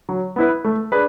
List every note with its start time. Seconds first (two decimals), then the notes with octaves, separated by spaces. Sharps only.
0.09 F#3
0.36 B3 E4 B4
0.64 A3
0.92 D4 G#4 B4